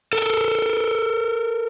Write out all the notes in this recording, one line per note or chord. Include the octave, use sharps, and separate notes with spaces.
A4 A#4